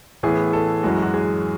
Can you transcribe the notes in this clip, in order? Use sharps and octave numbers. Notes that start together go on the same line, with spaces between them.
A2 E3 B3 G#4
A4
F#2 E3 G#3 F#4
F#4
G#4